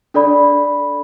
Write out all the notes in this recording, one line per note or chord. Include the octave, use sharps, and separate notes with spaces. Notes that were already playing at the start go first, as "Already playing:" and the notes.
D4 A4 D5 B5